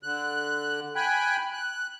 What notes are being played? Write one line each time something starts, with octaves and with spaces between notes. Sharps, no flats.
D3 F#6
G5 G#5 B5 F#6
F#6